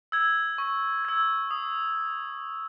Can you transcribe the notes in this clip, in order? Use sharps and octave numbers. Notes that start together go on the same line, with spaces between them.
E6 G#6
C#6
E6 G#6
D#6